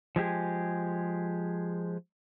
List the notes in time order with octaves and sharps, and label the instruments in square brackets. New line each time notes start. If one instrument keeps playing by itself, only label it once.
[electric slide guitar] F3 G#3 G4 G#4